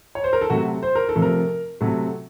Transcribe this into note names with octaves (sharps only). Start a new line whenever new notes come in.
C#5
C5
A#4
A4
C3 F#3 A3 F#4
C5
A#4
A4
C3 F3 A3
A#4
C3 F#3 A3